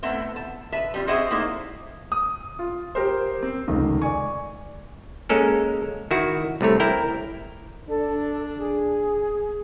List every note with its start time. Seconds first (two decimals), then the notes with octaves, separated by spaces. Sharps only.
0.03 A2 A3 B3 C4 E5
0.36 A5
0.72 B4 E5 A5
0.94 G3 C4 F4
1.07 C4 F#4 G#4 C5 D#5 E5
1.30 A3 A#3 D#4 E4 C5
2.12 D#6
2.59 F4
2.95 G4 A#4 C5
3.43 C4
3.68 F1 C#2 D#3
4.02 D5 G#5 C#6
5.29 G#3 A#3 C#4 A4 A#4
6.11 D#3 E4 F#4
6.61 C2 C3 A3 C#5
6.80 E4 A#4 G5
7.89 D4 A4
8.58 G#4